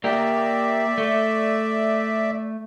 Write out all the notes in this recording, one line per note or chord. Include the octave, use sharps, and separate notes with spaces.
A#3 G4 D5 E5
A3